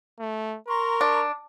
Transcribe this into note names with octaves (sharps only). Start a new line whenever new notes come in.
A3
A#4 A#5 C6 C#6
D4